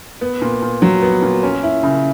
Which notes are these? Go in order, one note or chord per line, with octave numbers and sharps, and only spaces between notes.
B3
A#2
A#2
F#3
B3
A#2
C#4
E4
C#3